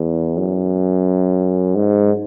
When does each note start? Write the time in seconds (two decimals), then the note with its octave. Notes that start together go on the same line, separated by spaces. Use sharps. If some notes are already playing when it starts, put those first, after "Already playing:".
Already playing: E2
0.37 F#2
1.76 G#2